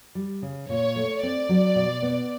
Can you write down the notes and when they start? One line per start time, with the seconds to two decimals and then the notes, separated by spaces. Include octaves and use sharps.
0.15 G3
0.42 C#3
0.69 A#2 C#5
0.96 A3
1.23 C4 D5
1.49 F#3
1.76 B2
2.02 B3